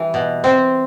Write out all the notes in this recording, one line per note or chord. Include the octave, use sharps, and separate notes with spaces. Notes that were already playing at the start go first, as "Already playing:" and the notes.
Already playing: E3 G3
B2
C4